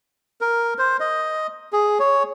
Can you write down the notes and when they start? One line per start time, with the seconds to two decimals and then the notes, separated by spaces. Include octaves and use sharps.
0.41 A#4
0.78 C5
1.00 D#5
1.73 G#4
1.99 C#5